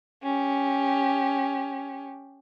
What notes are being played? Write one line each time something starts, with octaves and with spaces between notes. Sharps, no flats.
C#4 G4